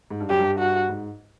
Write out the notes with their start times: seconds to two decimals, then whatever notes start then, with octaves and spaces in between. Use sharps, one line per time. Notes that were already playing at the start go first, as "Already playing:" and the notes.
0.11 G#2
0.20 G2
0.30 F#2 G4
0.39 G2
0.59 F#4
0.89 G#2